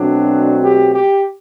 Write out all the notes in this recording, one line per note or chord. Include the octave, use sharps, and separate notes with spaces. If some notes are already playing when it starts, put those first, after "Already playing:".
Already playing: B2 F#3 A3 C4 D4
G4
G4